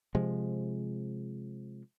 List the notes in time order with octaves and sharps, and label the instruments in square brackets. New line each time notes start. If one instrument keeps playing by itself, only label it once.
[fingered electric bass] C3 F3 G#3